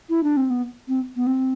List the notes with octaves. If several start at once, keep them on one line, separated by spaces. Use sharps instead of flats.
E4
D4
C4
B3
C4
B3
C4